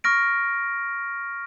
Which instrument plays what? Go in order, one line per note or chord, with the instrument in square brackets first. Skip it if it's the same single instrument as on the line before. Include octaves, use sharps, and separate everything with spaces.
[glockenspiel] C#6 F6 A#6 D7